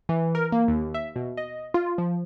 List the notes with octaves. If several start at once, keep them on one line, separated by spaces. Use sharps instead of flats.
E3
A#4
A#3
D#2
E5
B2
D#5
F4
F3